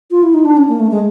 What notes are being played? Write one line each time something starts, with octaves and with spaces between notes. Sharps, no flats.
F4
E4
D#4
D4
C#4
A#3
A3
G#3